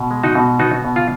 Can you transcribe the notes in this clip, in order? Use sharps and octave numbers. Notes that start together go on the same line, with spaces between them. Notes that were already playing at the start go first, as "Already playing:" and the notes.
Already playing: B2
G#3
D#4 F#4
B2
B3 D#4 F#4
B2
F4